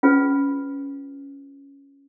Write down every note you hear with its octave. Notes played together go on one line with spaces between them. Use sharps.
C#4 F4 G#4 B4